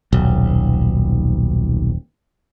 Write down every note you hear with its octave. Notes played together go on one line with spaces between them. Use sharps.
D#1 B1